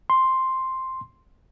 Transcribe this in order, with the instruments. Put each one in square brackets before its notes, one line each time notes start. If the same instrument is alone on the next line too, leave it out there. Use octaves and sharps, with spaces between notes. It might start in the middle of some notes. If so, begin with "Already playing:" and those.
[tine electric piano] C6